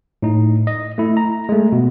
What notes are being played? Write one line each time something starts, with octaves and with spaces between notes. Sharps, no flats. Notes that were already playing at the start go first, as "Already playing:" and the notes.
A2 D#4
D#5
A3 E4
A#5
G#3 A3
B2